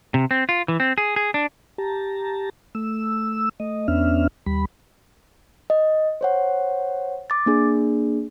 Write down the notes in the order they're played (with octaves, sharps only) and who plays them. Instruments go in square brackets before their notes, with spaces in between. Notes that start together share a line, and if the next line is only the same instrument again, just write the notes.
[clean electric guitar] C3
C4
F4
E3
C4
G#4
G#4
D4
[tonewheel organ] G4 A5 A#5
A3 E6
A3 D#5
E2 B3 C#4 D4 E5 F6
D#2 G3 B5
[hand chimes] D#5
C5 C#5 F#5
D6 A6
A#3 D4 G#4